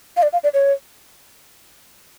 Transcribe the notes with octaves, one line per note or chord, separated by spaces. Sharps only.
F5
D5
F5
D5
C#5